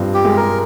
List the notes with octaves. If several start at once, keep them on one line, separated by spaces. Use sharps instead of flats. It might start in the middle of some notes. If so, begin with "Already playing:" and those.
Already playing: G2 F3 C4
G4
G#3
A#4